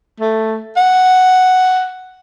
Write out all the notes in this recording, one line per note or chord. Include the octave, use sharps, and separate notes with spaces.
A3
F#5